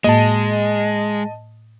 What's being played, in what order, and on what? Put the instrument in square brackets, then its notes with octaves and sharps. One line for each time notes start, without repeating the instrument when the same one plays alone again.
[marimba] A2 A#3 [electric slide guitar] G#3 [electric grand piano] D#5 A5